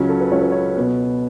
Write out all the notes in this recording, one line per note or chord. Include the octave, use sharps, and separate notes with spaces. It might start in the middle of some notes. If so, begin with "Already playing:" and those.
Already playing: C#2 C#3 F#3 C#4
A4
B4
C#2 C#3 F#3 C#4 C#5
B4
C#5
B2 B3